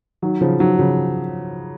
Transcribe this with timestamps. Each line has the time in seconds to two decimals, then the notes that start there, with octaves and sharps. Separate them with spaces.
0.22 D#3 F#3
0.41 C#3 F3
0.60 D#3 F#3
0.79 C#3 F3